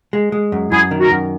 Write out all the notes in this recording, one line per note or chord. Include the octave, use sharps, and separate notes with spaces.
G#3
G#3
F#2
F#2 E4 G#4
D#3
F#4 A#4
F#2